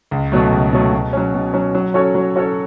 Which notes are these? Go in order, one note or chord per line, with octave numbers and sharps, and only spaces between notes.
C#2
B2 F#3 A3
C#2
B2 F#3 A3
B2
F#3 C#4
B2
F#3 C#4
F#3
C#4 F#4 A4 C#5
F#3
C#4 F#4 A4 C#5